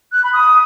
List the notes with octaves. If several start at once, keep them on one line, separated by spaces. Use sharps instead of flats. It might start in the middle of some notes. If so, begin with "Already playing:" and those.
F#6
B5
D#6